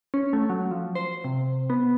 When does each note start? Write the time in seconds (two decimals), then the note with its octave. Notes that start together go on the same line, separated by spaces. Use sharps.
0.14 C#4
0.33 A3
0.50 F#3
0.71 F3
0.95 C5
1.24 C3
1.70 B3